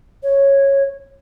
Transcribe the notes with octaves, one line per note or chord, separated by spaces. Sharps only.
C#5